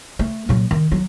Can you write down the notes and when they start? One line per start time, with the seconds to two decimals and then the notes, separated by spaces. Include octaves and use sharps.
0.19 A3
0.49 A#2 F#3
0.71 D#3
0.92 F#3